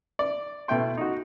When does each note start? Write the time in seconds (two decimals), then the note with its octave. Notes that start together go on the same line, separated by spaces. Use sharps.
0.19 D5
0.68 B2 A3 E4 G5 C6
0.97 D#4 F#4